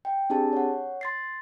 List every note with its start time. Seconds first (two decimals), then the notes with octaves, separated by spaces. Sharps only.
0.05 G5
0.30 C4 D4 G4 G#4 A5
0.53 C#5 F#5
1.01 C6 A6 C7